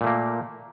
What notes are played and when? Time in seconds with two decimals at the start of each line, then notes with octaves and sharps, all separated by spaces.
0.01 A#2
0.04 A3
0.07 A#3